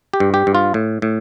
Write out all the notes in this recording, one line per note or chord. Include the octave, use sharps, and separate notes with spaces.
G4
G2
G4
G2
F4
A2
A2